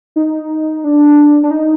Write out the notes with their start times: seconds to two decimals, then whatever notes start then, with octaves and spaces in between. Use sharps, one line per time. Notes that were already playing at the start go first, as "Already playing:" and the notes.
0.16 D#4
0.84 D4
1.43 D4
1.51 D#4